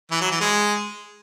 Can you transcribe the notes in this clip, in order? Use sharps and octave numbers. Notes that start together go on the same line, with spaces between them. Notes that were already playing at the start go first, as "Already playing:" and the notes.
E3
F#3
E3
G#3